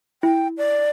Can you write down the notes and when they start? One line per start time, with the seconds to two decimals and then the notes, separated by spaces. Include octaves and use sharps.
0.23 E4 G5
0.58 D5